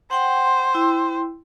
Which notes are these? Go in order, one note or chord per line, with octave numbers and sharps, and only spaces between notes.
C5 F#5 G5 C6
E4 G5 E6